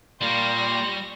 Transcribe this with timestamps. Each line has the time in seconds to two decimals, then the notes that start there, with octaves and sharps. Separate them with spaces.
0.21 A#2 G3 C6 C#6 A#6